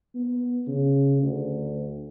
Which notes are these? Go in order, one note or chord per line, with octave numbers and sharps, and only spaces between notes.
B3
C#3
D2